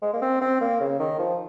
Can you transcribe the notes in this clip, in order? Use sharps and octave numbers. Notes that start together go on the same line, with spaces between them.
G#3
A#3
C4
C4
A#3
C#3
D#3
F3